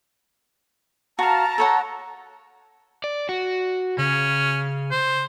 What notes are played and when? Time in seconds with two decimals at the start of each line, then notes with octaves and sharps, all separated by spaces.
1.19 F#4 F5 A5 A#5
1.58 A4 C#5 F#5
3.04 D5
3.29 F#4
3.98 C#3 C#4
4.91 C5